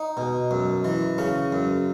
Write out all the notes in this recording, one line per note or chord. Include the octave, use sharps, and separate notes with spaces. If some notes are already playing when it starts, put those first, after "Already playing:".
Already playing: D#4
B2
F#2
E3
C#3 C#4
F#2